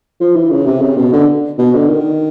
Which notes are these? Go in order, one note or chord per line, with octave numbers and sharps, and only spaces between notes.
F3
E3
C#3
C3
C#3
B2
D3
B2
D3
D#3